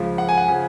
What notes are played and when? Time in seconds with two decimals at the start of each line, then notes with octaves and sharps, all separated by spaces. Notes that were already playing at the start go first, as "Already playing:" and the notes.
Already playing: C#2 C#3 F3
0.18 F#5
0.29 G#5
0.38 F#5
0.48 C#3 F3